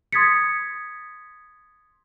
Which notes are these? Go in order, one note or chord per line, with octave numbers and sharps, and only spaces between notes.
C6 D#6 G#6 A6 B6 C#7